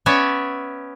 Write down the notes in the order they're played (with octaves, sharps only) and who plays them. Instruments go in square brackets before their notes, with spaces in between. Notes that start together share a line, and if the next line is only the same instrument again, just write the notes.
[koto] B3 C#4 C#5 D5 E5